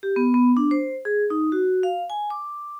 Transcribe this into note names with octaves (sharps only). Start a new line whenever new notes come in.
G4
B3
B3
D4
C5
G#4
D#4
F#4
F5
G#5
D6